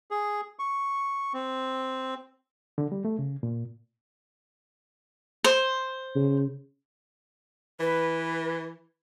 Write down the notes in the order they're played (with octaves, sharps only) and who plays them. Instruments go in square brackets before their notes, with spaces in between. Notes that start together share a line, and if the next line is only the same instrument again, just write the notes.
[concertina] G#4
C#6
C4
[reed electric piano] D3
G3
A3
C#3
A#2
[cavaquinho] C5
[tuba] C#3
[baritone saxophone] E3 [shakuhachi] B4